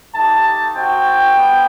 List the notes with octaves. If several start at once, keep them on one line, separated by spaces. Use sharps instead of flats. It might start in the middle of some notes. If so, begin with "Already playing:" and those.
A3 D#4 G4 A5
C4 F#4 G5
G3 B3